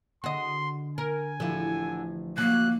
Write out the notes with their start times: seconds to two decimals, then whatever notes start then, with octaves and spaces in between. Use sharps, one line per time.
0.24 D3 F#4 D#5 C6
0.98 A#4 G#5
1.40 A1 D3 F3 E4
2.38 F#3 A#3 F#6